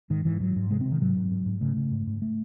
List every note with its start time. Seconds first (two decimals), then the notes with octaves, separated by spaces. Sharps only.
0.10 G#2 D#3
0.25 G#2 E3
0.40 G#2 F#3
0.56 G#2
0.71 C3 G#3
0.81 C3 C4
0.92 D#3
1.01 G#2 F#3
1.16 G#2
1.31 G#2
1.46 G#2
1.61 C#3 A3
1.77 C#3
1.91 G#2
2.07 G#2
2.22 A3